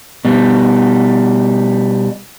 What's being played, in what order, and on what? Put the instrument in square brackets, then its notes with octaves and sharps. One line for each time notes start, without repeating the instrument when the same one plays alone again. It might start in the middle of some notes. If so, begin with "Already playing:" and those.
[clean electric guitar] B2 G3